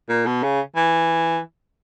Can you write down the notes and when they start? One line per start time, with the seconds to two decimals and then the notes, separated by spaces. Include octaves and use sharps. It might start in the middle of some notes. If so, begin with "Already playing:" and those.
0.09 A#2
0.26 B2
0.43 C#3
0.76 E3